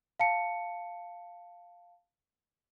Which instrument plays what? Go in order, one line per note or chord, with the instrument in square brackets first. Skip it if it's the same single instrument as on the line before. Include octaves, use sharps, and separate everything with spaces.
[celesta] F5 A5 C#7